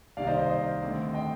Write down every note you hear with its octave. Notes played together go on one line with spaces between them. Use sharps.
C2 C3 D#3 A#3 D5 F5
C5 D#5
C5 D#5
C5 D#5
D#2 D3 A3 C4
D#5 G5